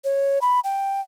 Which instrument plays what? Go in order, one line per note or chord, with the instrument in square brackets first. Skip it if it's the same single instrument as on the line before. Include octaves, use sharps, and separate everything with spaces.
[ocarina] C#5
B5
G5